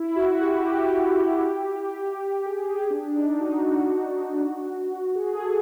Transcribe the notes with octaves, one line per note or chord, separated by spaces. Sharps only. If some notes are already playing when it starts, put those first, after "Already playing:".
Already playing: E4
F#4
G4
F#4
G4
G#4
G4
D4
D#4
F#4
G#4
A4